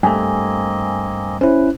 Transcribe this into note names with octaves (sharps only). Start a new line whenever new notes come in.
G2 A3 A#3 C4 D#5 G#5
C#4 E4 B4 C5